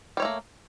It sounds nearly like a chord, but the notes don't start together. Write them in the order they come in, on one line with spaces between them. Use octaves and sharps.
G3 C#5 A3 A#3